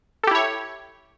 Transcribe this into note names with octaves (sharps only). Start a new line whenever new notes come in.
E4 G4 A4 C#5